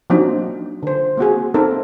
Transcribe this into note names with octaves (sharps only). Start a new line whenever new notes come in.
F3 F#3 A#3 C4 D4 D#4
D3 C5
A#3 C4 F#4 G#4
C4 D#4 A4 A#4